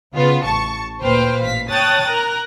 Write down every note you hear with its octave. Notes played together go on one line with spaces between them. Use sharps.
C#3 B3 F4
A1 A5 C#6
D2 A#2 B4 C5 G5 F6
A1 F5 B6
C#5 G5 A5 D#6 F#6 A6
A#4 A#5 F#6